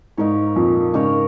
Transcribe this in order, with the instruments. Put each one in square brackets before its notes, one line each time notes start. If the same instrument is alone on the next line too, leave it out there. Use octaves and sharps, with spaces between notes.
[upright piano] G#2 [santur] A#3 D#4 A#4 C#5
[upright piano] F2 A#2
[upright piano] G#2 C#3 [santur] A#3 D#4 A#4 C#5